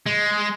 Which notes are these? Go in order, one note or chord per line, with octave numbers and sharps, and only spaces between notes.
G#3